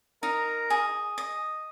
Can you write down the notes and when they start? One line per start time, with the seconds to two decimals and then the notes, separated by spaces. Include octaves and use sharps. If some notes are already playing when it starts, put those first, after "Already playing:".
0.22 D#4 A#4 A#5
0.70 G#4
1.18 D#5